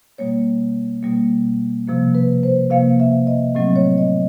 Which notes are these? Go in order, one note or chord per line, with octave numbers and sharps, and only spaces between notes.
B2 G3 A#3 C#5
B2 G3 A#3
C3 F3 A#3
B4
C5
C3 F3 A#3 F5
E5
D#5
A2 F#3 A3 C4 D#5
C#5
D#5